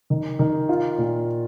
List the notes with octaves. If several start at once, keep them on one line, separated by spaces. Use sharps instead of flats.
D#3
D#3
F4
A#2